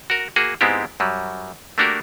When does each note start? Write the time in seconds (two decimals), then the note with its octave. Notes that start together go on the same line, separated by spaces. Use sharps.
0.10 F#4 A#4
0.36 A#3 F#4 G#4
0.61 G#2 G#3 B3 C4 E4 G4
1.00 F#2 F#3 G3
1.78 A3 A#3 D4 F#4 G4 A#4